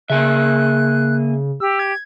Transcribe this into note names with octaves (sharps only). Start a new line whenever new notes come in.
C#3 A#3 G#4 E5 F#6
G4 E6
G#6